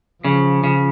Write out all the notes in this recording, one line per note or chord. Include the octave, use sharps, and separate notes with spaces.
C#3 F3
C#3